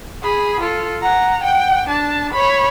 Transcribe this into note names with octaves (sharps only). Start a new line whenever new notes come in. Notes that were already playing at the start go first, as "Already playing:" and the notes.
G#4 B5
F4 A4
F#5 A#5
F#5 G5
D4 A5
C#5 B5